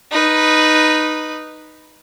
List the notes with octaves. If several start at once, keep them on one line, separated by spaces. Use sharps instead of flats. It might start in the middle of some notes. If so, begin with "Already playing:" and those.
D#4 B4